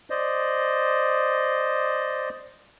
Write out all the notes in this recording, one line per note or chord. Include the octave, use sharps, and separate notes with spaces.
C5 D5 D#5